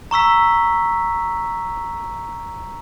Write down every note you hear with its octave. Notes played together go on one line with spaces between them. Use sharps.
A#5 C#6 E6 B6